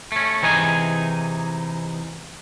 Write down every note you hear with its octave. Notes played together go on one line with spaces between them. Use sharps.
A3 C#4
C3 E3 D#4 G#4 G#5